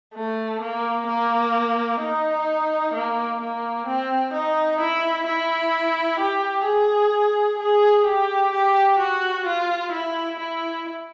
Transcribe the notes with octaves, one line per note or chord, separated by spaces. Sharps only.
A3
A#3
A#3
D#4
A#3
A#3
C4
D#4
E4
E4
G4
G#4
G#4
G4
G4
F#4
F4
E4
E4